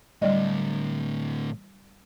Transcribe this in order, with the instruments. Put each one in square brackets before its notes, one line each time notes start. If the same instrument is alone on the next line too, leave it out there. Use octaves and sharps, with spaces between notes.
[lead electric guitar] A2 D3 [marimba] G3 D5 D#5